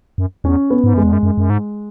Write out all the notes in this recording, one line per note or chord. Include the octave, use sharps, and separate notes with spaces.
F#2
E2 C#4
B3
G#2
F#2 G#3
E2
F#2
F#2
F#2
G#2